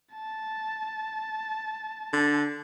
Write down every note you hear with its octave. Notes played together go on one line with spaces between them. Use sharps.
A5
D3